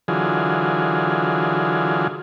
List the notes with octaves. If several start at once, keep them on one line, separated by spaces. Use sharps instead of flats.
D3 E3 F#3 F4 G#4